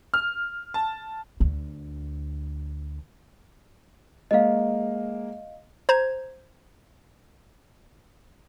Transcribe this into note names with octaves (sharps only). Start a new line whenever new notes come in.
F6
A5
D2 D3
G#3 A#3 D#5 F5
C5 A#5 G#6